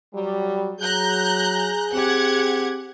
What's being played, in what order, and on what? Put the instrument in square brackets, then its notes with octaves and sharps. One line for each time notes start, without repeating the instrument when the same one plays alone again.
[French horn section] F#3 G3
[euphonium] F#3 [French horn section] G#4 [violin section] A#5 F#6 G6
[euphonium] C4 [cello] G4 [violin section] F#5 G#6